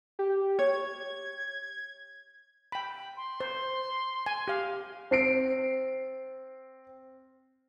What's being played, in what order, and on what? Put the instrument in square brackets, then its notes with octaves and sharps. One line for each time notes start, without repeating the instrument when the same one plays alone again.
[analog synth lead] G4
[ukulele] C#5 [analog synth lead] G#6
[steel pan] G5 B5
[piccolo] C6
[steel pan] C5
G#5
G4 F5
[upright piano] C4 C7 D7